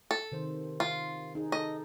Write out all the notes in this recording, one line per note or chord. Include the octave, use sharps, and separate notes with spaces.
A4
C3 D#3 C5
F4
D#4 G#4
A4 D#5